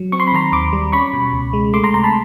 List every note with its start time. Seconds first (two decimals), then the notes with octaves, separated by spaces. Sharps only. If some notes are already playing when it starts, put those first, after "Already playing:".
Already playing: F#3
0.12 C4 C#6
0.20 C6
0.27 B5
0.33 D#3 A#5 C6
0.52 D#2 C6 D6
0.73 G3
0.92 C#4 B5 C#6
1.13 B2
1.33 C#2
1.53 G#3
1.73 A3 C6 D6
1.84 A#5 C6
1.94 C3 A#5 C6
2.04 A5 B5